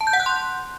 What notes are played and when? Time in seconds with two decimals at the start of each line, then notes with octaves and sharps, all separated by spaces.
0.01 A5
0.07 G6
0.13 F#5
0.20 F#6
0.26 C6